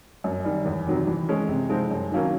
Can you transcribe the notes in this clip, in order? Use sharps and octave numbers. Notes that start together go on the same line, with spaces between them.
F#2
D#3 G3
E2
C3 D#3 F#3
E3
G#3 C#4
C3
F3 G#3 C4 D#4
F#2
D#3 F#3 A#3 C#4